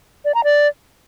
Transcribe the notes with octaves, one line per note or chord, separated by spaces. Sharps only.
D5
A#5
D5